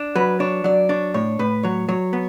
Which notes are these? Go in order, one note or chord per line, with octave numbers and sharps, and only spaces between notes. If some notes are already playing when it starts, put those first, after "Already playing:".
Already playing: D4
F#3 B4
D4 C#5
F#3 D5
D4 C#5
A2 C#5
A2 B4
F#3 C#5
F#3 C#5
B3